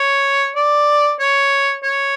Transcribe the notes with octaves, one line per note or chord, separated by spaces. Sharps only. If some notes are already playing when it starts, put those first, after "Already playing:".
Already playing: C#5
D5
C#5
C#5